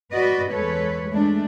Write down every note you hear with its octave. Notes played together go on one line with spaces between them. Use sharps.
F#4 B4 D5 D#5
E2 G#3 A4 B4 C#5
G#3 A3 D4